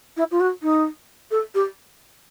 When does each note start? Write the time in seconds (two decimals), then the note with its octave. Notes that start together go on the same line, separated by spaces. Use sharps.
0.16 E4
0.31 F4
0.40 F#4
0.62 D#4
1.31 A4
1.54 G4